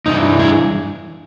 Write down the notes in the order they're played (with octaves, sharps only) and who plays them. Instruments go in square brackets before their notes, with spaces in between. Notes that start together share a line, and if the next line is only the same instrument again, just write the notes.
[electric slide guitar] G2 E3 D#4
G#4